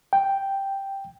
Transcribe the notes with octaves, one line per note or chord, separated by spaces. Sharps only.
G5